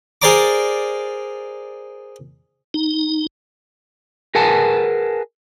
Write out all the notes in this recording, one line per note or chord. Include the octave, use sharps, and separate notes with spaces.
G#4 A#4 C5 D5 A#5 D6
D#4
G#4 A#4 B4 F#5 G#5 A5